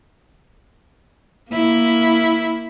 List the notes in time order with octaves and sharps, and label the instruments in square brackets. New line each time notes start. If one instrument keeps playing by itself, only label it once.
[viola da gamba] A#3 E4